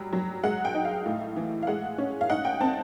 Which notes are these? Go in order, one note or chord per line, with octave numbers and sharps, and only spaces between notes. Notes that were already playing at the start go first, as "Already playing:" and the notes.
Already playing: F#3 G3
F#3
G#3 F#5
G5
D#4
F5
A2
E3
F5
G#3 F#5
C#4
F5
D#4 F#5
G5
C4 A5